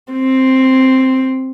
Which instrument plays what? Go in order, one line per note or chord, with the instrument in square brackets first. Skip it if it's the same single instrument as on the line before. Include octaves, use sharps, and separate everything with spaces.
[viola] C4